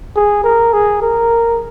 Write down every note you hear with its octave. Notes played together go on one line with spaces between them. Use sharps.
G#4
A#4
G#4
A#4